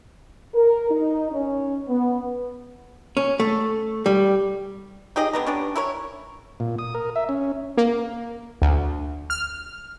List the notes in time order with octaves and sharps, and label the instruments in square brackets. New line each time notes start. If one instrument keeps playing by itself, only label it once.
[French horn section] A#4
D#4
C#4
B3
[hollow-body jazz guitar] C#4
A3
G3
[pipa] D#4 G4 G#4 D#5
D3 B3 A#5
C#4 D4 G4
E4 A#4 C#5
[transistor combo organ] A#2
D#6
A#4
E5
C#4
[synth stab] A#3
D2
F6